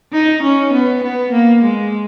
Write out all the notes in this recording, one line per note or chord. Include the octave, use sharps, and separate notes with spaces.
D#4
C#4
B3
B3
A#3
G#3